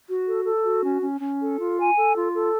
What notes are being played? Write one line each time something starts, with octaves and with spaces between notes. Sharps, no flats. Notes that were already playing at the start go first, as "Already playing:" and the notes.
F#4
A4
A4
F#4
C#4
C#4
C#4
A4
F4
G#5
A4
F4
A4